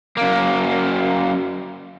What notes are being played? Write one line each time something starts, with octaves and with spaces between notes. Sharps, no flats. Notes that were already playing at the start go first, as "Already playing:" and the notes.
F#2 A#3